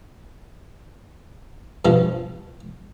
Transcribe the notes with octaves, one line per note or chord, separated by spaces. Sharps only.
G2 B2 F3